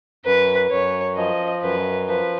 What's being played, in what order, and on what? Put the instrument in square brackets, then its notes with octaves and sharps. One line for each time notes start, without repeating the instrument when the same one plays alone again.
[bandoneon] F#2 [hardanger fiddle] B4
[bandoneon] F#2 [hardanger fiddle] C#5
[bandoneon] F3 [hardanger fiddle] D#5
[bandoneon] F#2 [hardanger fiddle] B4
[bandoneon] F3 [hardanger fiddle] B4